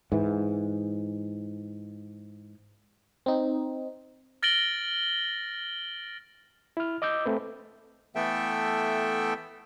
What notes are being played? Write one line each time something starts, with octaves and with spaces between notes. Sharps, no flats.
G#2 E3
C4 D#4
F6 A6 A#6 D7 F#7 G7
E4 F6
D#5 D6 E6 G6
A3 C4 B4
E3 A3 B3 A4 E5 G5